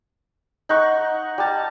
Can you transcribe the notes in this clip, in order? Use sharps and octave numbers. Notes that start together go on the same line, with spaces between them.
D#4 F#5 C#6
G3 A5